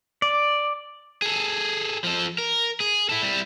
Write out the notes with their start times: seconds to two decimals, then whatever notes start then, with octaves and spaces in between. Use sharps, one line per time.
0.22 D5
1.22 G#4 A4
2.04 F3 A4
2.38 A#4
2.80 G#4
3.09 E4 A4
3.22 G3 E4